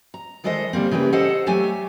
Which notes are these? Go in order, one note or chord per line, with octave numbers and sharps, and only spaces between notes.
A#5
D#3 E3 G#3 A4 C5 D#5
D3 G3 A#3 C4
C#3 E3 A#3 G4 B4
G4 A4 C5 D#5 F5 F#5
F#3 A3 G4 G#5